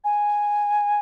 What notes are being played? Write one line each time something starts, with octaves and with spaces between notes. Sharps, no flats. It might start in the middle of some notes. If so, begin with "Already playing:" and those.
G#5